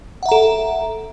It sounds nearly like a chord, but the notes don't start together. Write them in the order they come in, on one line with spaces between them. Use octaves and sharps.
F#5 E5 A#5 A4